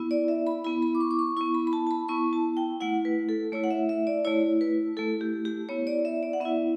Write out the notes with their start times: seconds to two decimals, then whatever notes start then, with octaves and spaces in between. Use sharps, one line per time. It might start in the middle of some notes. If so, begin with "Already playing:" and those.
Already playing: B3 E4
0.11 D5
0.28 E5
0.47 B5
0.64 B3 E4 B5
0.82 B5
0.95 D6
1.01 C#6
1.11 D6
1.19 C#6
1.37 E4 C#6
1.41 B3
1.54 B5
1.67 B5
1.73 A5
1.87 A5
1.91 B5
2.08 B3 E4 C#6
2.33 A5
2.57 G5
2.81 A3 E4 F#5
3.05 B4
3.29 A4
3.52 A3 E4 C#5
3.64 F#5
3.71 E5
3.89 E5
4.07 D5
4.25 A3 E4 C#5
4.61 B4
4.97 A3 E4 A4
5.21 G4
5.45 G4
5.69 B3 E4 C#5
5.87 D5
6.05 E5
6.23 D5
6.33 F#5
6.41 B3 E5
6.45 E4